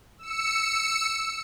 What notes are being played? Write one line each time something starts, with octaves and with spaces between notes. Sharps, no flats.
E6 C#7